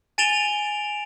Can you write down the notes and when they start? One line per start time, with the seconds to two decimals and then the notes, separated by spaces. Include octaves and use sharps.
0.18 G#5 A6 D7 E7 F7 G7